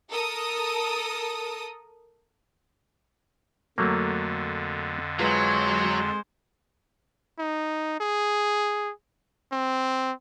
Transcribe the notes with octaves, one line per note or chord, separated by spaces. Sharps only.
A4 A#4 D#6
F2 D3 F#3 A3 A#3
F#3 G#3 F4 B4 C5
D#4
G#4
C4